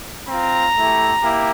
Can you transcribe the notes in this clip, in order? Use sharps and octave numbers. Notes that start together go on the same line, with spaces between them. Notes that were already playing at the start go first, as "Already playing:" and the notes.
C4 F4 A#5
A3 E4 G4
A#3 E4 G4